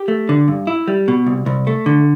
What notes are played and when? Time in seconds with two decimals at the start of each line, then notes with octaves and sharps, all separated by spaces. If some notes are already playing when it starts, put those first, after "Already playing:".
Already playing: G4
0.08 A3
0.29 D3
0.48 G2
0.67 E4
0.88 G3
1.08 B2
1.26 C2
1.46 C2
1.67 A3
1.86 D3